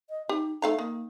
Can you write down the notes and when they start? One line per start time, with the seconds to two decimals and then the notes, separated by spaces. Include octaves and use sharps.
0.10 D#5
0.29 D#4 G4
0.62 A3 D#4 F5 A#5
0.78 D#3 A#3